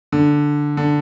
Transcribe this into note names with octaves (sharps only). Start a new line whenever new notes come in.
D3
D3